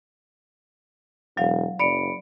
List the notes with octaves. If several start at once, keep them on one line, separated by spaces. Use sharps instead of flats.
E1 F#3 F5
F#1 D5 B5 C#7 D7